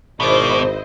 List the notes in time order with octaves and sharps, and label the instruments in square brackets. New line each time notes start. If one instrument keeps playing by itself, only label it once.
[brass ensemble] G#1 [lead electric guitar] B2 [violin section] E4 C5 D#5 [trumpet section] D5 D6